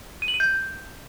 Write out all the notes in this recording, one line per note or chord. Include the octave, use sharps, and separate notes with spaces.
D#7
F#7
D#7
G6